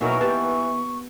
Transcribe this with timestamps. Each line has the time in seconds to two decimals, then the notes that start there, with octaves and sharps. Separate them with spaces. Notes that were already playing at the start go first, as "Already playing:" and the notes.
0.01 B2 E3 F#3 A#3 D#4 A#4 C#6
0.21 B3 G4 A5